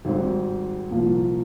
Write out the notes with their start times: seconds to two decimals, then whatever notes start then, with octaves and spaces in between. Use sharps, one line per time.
0.05 G#1 G#2 G3 C4 G4
0.90 C2 A#2 F3 A#3 F4